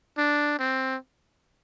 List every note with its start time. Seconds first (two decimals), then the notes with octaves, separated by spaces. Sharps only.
0.18 D4
0.59 C4